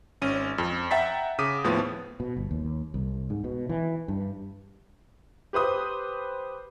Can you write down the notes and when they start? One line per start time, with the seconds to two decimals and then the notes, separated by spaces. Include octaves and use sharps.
0.22 G#1 C#4 D#7
0.58 F2
0.91 E5 F#5 G5 A#5 A6 B6
1.39 C#3 D6 D#6 B6 D#7
1.64 D#2 A2 F3 B3
2.20 B2
2.36 G1
2.51 D#2
2.94 C2
3.30 G#2
3.44 B2
3.69 E3
4.08 G2
5.53 G4 B4 C5 D#6